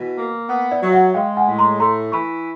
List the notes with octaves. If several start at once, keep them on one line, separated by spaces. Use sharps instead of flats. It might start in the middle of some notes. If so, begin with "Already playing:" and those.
Already playing: B2 E3
A#3
B3
D5 E5
F#3
E5 F#5
G#3 F5 G5
F#5 G#5
A2
A#5 C6
A3 A#5 C6
E3 B5 C#6